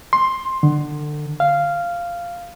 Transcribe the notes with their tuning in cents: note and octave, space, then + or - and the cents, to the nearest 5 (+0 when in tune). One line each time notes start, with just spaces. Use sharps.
C6 +10
D3 +25
F5 -10